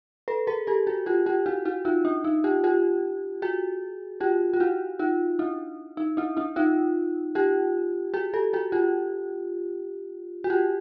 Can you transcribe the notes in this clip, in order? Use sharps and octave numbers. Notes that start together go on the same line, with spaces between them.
A4 B4
G#4 A#4
G4 A4
F#4 G#4
F4 G4
F4 G4
E4 F#4
E4 F#4
D#4 F4
D4
D#4
F4 G4
F4 G4
F#4 G#4
F4 G4
F4
E4 F#4
D#4 F4
D4 E4
D#4
D4 E4
D4 E4
D#4 F4
F4 G4
F#4 G#4
G4 A4
F#4 G#4
F4 G4
F#4
F4 G4